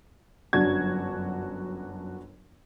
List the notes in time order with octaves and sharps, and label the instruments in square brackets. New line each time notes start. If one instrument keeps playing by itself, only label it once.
[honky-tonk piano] G1 F#2 D4 F#4 G#6